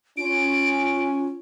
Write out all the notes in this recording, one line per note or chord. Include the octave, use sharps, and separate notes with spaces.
C#4 F4 D7